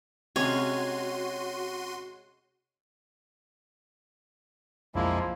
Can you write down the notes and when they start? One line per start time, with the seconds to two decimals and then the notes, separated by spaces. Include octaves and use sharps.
0.36 C3 G#3 C#4 F#4 C#5 C6 D#7
4.95 B1 F2 F3 G#3 A#3 D4 E4